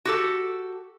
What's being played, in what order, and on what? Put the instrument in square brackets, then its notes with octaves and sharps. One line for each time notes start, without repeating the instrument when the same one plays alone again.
[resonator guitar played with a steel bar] F#4 G4 A4